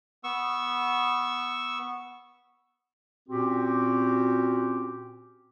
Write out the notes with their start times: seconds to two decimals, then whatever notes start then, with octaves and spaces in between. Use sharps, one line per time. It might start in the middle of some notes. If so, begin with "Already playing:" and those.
0.24 B3 C#6 E6
3.28 A#2 C4 C#4 F#4 G4